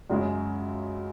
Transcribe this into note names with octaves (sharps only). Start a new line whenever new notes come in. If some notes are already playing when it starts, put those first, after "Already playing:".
F#2 C#3 G#3